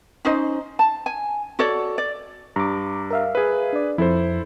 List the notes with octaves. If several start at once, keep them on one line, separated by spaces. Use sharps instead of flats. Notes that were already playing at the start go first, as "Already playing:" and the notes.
C#4 D#4 C5 D#5
A5
G#5
F#4 A4 C#5 D5
D5
G2 A#5 D6
A#4 E5 F5
G#4 B4
D4 D5
F2 E4 A4 C5